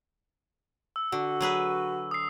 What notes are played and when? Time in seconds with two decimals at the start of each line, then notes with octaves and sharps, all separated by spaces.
0.96 E6
1.12 D3 F#4
1.41 F#3 G#4 B4
2.11 D#6 C7